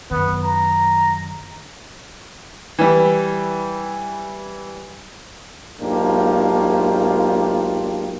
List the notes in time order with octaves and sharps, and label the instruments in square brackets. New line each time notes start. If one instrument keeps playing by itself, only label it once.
[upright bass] F#2 D#3 [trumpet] B3
[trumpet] A#5
[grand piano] E3 G3
[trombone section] B1 G#2 A#3 D4 F4 G4